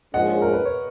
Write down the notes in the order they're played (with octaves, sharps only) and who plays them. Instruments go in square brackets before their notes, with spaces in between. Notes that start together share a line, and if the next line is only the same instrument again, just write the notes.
[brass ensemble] A#1 G#2 F3 G#3 C#4 [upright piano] D#5 F#5
[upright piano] A#4
B4
C#5